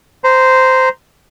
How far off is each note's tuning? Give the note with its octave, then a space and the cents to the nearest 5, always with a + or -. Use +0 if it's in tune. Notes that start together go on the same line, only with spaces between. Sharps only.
C5 -10 A#5 +0